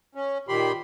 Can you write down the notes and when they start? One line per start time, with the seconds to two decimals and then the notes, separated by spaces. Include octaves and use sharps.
0.15 C#4
0.49 A#2 D#3 G4 B5 C6